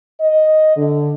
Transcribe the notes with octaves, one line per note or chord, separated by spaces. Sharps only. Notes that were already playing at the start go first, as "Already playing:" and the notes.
D#5
D3